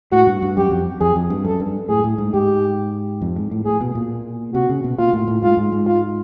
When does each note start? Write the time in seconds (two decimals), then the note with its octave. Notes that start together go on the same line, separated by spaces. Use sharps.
0.12 A2 F#4
0.27 G2
0.42 G2
0.57 F#2 G4
0.71 F2
1.01 F2 G#4
1.16 F2
1.30 G2
1.44 F#2 A4
1.60 G2
1.89 A2 G#4
2.04 A2
2.18 G#2
2.34 G#2 G4
3.22 F2
3.36 G#2
3.51 A2
3.65 A2 G#4
3.81 B2
3.95 A#2
4.54 C3 F#4
4.70 C#3
4.84 B2
4.98 A#2 F4
5.13 A2
5.28 A2
5.42 G#2 F4
5.57 G#2
5.72 G#2
5.87 F4